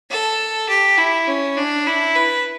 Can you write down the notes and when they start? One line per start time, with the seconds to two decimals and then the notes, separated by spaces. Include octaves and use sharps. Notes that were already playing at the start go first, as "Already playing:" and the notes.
0.10 A4
0.69 G4
0.98 E4
1.27 C#4
1.57 D4
1.86 E4
2.15 B4